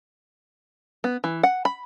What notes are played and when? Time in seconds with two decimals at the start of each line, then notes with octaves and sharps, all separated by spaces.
1.04 B3
1.24 E3
1.43 F#5
1.65 B5